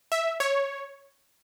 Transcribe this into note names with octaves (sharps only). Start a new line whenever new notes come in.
E5
C#5